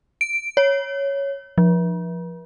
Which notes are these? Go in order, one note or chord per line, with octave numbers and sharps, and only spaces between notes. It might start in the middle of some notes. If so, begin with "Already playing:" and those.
D7
C#5
F3